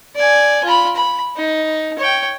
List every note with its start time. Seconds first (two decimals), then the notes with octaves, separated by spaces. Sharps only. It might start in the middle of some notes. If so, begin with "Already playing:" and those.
0.16 D5 G#5
0.64 F4 B5
0.96 B5
1.36 D#4
1.99 C#5 G5